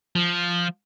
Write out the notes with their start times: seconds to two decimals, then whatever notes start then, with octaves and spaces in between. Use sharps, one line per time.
0.15 F3